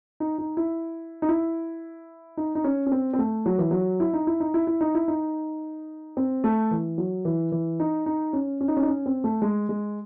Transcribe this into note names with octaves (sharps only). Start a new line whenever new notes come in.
D#4
D#4
E4
D#4
E4
D#4
D#4
C#4
C#4
C4
C4
A3
F#3
E3
F#3
E4
D#4
E4
D#4
E4
E4
D#4
E4
D#4
C4
A3
E3
F#3
E3
E3
D#4
D#4
C#4
C#4
D#4
C#4
D#4
C#4
C4
A3
G#3
G#3